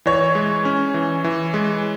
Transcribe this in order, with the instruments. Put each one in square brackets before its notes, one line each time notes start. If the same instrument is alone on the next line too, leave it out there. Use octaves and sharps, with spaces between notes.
[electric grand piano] E3 [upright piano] C#5
[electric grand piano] G#3
C#4
E3
E3
G#3